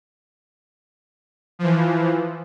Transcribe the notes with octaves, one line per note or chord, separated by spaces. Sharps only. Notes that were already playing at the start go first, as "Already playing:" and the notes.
E3 F3